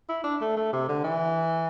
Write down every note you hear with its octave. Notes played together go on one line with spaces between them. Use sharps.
E4
D4
A3
A3
C3
D3
E3